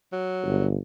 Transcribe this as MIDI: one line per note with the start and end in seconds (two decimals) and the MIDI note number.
0.13 0.66 54
0.45 0.76 31